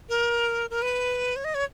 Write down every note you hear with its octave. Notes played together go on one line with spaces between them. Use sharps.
A#4
A#4
B4
C#5
D#5
C#5